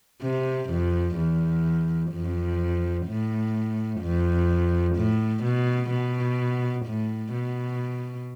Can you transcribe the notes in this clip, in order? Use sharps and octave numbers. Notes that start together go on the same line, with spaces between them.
C3
F2
E2
F2
A2
F2
A2
B2
B2
A2
B2